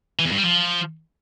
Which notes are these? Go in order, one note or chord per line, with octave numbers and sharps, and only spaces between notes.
E3
E2
G2
G3
F3